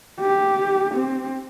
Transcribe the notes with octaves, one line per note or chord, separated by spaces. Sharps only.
G4
C4